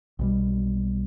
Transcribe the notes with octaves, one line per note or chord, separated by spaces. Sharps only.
B1 B2 G3